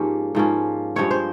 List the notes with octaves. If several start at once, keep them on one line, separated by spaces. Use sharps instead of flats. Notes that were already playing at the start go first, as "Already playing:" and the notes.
Already playing: G#2 F3 A#3 C#4 G4
G#2 F3 A#3 C#4
G2 F3 G#3 C4 C#5
C5